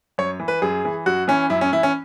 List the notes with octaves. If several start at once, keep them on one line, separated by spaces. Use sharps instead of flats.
F#2 C#5
E3
B4
F#2 G#4
E3
F#2 F#4
E3 C#4
F#2 E4
C#4
E3 E4
C#4